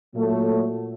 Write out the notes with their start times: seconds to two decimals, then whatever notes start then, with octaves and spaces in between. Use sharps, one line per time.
0.14 A#2 F#3 A3